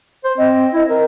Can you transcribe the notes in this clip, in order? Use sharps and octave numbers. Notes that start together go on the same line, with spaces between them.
C5
C4 D#5
E4
A#4